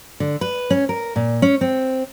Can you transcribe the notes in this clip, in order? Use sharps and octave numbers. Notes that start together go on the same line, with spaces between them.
D3
B4
C#4
A#4
A#2
C#4
C4